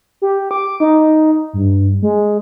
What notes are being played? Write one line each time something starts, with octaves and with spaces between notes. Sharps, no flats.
G4
D6
D#4
G2
G#3